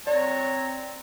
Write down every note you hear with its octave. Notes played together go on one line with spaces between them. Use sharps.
C4 C#5 D5 A#5